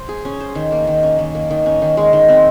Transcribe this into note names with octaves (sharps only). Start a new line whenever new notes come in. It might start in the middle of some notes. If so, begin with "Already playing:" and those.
Already playing: C5
G#4
C#4
C5
D#3
A#3
D#3
C#4
D#3
A#3
D#3
C#4
D#3
G#3
D#3
C4